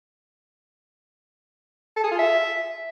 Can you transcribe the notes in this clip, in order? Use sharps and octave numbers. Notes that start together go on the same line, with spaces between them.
A4
G#4
F4
E5